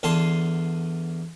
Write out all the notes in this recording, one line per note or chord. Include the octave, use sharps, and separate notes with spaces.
E2 D3 F5 A5 C6